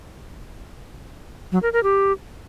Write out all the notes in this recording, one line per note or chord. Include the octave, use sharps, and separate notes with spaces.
F#3
A#4
A#4
G4